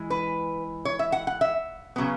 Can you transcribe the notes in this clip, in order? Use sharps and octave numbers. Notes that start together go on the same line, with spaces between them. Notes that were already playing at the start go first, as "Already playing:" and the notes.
Already playing: E3 G#3
B4
C#5
E5
F#5
F#5
E5
C#3 F#3 B3